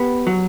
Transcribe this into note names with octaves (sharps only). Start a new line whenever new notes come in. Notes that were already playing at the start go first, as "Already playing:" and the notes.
Already playing: B3 G4
F#3